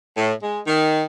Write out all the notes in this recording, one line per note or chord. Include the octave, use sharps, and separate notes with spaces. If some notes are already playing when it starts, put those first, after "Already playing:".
A2
G#3
D#3